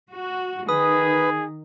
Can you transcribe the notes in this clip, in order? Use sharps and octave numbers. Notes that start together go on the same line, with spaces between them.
F#4
D#3 G#4 B4 D#6